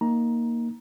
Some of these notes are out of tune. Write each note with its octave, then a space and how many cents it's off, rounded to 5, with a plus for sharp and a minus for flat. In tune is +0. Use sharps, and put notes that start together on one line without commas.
A#3 +0 D#4 +0 A#5 +15